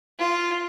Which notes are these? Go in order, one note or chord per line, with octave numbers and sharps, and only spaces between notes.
F4